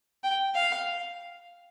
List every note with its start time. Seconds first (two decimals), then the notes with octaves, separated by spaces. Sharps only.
0.23 G5
0.55 F5